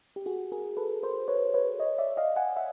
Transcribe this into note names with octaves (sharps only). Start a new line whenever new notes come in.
G4
F#4 G#4
G#4 A#4
A4 B4
A#4 C5
B4 C#5
B4 C#5
C#5 D#5
D5 E5
D#5 F5
F#5 G#5
E5 F#5